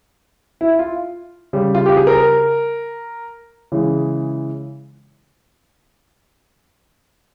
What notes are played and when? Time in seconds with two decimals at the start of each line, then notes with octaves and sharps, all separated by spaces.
0.61 E4
0.79 F4
1.53 C#3 G3
1.75 F4
1.86 G4
1.97 G#4
2.07 A#4
3.72 C#3 E3 G#3